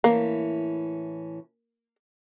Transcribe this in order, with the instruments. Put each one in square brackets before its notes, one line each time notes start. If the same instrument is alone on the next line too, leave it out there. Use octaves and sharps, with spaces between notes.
[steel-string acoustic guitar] A2 E3 C#4 [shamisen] A#3